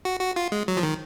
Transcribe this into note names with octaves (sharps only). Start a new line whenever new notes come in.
F#4
F#4
F4
G#3
F#3
F3
D#3